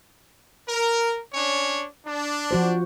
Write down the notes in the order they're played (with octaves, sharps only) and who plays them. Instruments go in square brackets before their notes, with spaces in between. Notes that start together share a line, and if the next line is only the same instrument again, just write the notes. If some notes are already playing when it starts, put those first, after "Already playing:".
[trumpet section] A#4
C#4 D4 C#5
D4
[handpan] F3 F#4 C5